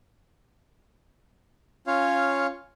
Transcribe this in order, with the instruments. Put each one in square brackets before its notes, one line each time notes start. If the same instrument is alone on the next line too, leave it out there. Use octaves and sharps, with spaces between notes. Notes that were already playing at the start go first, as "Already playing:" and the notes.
[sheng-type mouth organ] C#4 F4 C#5 F5